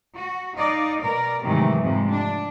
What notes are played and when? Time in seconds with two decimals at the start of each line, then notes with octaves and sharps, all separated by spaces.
0.16 F#4
0.58 D#4 D5 D#5 F5
1.02 B2 A#4 D5
1.43 G#2 C3 D#3 E3 F#3 A3
1.80 F2 G#2 C3 G#3
2.11 D4